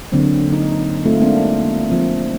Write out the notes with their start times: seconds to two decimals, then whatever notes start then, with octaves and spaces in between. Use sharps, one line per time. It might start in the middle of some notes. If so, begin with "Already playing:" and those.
0.12 D3 F#3 A#3 C4
0.49 D3 D#4
1.06 A3 C4 F4
1.20 G#3 A#3 C4 D4 F5
1.90 F3 C4